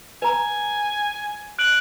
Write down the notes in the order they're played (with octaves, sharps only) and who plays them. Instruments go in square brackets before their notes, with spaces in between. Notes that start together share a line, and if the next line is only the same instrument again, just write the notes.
[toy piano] B4 A#5 [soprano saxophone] G#5
[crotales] F#6 D7 F#7